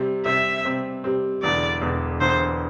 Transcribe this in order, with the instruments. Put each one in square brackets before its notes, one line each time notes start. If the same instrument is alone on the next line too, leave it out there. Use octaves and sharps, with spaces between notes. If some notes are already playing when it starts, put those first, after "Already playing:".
Already playing: [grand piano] C3 G3 C4
[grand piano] C3 G3 C4 [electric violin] E5
[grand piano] C3 G3 C4
C3 G3 C4
[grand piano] E1 E2 D3 [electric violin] D5
[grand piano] E1 E2 D3
[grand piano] E1 E2 D3 [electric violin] C5